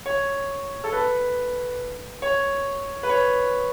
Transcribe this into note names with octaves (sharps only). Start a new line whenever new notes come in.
C#5
A4
B4
C#5
B4
C#5